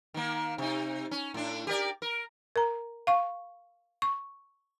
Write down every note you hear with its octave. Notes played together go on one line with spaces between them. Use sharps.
D#3 A#3
C3 D#4
C#4
A2 D4
G4 A#4 D5
A#4
A#4 A#5
F5 C#6
C#6